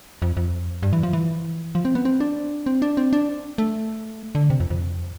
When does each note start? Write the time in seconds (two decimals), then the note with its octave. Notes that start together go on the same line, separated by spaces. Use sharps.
0.22 F2
0.37 F2
0.83 G2
0.93 E3
1.03 F3
1.13 E3
1.75 F3
1.85 C4
1.95 B3
2.05 C4
2.20 D4
2.66 C4
2.82 D4
2.97 C4
3.13 D4
3.58 A3
4.35 D3
4.50 C3
4.60 F2
4.70 F2